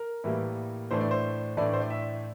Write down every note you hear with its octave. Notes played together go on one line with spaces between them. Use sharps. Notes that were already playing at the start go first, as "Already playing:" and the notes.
Already playing: A#4
A2 E3 G3 A#3
A2 E3 A3 D4 C5
D5
C5
A2 E3 A3 D4 D5
C5
D5
E5